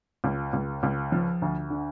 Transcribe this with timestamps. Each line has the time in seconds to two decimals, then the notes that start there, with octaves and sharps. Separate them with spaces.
0.24 C#2
0.53 C#2
0.83 C#2
1.12 F3
1.42 D2
1.70 D3